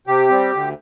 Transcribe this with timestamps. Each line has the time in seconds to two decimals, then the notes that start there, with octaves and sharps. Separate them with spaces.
0.07 C3 G4
0.29 G3 C4
0.51 D2